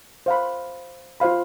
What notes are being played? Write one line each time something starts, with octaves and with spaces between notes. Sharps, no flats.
C5 F5 B5
F4 C5 F5 B5